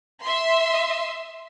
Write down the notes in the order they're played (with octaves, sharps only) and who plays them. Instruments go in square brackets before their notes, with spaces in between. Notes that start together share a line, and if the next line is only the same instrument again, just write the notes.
[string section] E5 C6